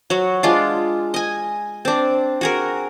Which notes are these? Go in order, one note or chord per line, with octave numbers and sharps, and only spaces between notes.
F#3 F#4
G#3 D4 F4
D#5 G#5
C4 D4
F#4 G#4 A#4